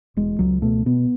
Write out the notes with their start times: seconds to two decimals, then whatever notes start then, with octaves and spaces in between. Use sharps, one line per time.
0.17 E1 G#3
0.39 C#2 F#3
0.62 B2 A3
0.86 B2 B3